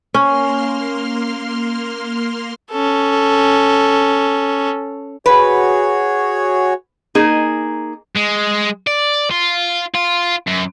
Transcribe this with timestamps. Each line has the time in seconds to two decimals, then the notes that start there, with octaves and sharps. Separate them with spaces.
0.14 A#3 C#4 C6 F6
2.71 C#4 A4
5.26 F#4 G#4 B4 C#5
7.15 A#3 D#4 G#4
8.17 G#3
8.87 D5
9.31 F4
9.95 F4
10.47 F#2